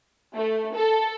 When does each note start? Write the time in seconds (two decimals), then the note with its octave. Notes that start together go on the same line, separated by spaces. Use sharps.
0.35 A3
0.75 A4